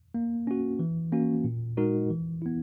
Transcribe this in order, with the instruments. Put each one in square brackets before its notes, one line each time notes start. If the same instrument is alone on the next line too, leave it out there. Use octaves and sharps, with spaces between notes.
[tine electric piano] A#3
C#4 F#4
E3
A#3 C#4 F#4
A#2
G#3 D#4 F#4 A#4
E3
B3 E4